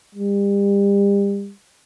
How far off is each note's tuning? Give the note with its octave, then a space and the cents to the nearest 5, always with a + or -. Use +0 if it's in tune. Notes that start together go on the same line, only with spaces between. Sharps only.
G3 +35